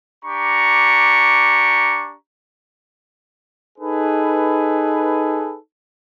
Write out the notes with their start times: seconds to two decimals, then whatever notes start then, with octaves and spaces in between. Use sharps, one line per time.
0.25 D4 G4 A#5 C#6
3.79 D#4 G#4 A4 B4